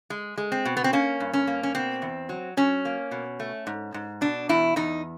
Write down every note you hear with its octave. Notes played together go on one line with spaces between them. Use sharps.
G#3
G#3
C4
B2
B3
C4
A#3 C#4
G2
C#4
A#3
C#4
B2 C4
E2
F#3
F#3 C#4
A#3
B2
A3
G#2
G#2
B2 D4
E2 E4
E2 D#4